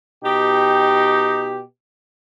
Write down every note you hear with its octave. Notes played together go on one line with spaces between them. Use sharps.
B2 D#4 G4